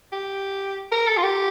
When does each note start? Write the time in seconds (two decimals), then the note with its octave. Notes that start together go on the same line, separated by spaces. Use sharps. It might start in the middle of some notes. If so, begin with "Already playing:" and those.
0.13 G4
0.92 A#4
1.08 A4
1.18 F4
1.24 G4